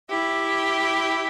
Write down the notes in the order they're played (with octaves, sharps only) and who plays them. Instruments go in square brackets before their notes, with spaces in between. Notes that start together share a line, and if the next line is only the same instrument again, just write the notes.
[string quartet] E4 G4